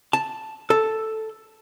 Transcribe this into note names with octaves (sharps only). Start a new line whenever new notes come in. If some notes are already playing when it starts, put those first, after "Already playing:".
A5
A4